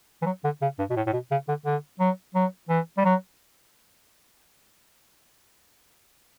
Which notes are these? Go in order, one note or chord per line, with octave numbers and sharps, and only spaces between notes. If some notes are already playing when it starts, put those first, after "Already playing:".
E3
F#3
D3
C#3
G2
B2
A2
A2
B2
C#3
D3
D3
F#3
F#3
E3
G3
F#3